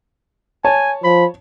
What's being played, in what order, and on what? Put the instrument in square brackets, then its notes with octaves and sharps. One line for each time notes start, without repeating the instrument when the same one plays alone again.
[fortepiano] C#5 A5 [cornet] G#5
[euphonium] F3 [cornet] B5